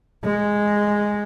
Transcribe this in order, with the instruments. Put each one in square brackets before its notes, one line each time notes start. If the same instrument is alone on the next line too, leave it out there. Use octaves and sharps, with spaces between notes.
[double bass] G#3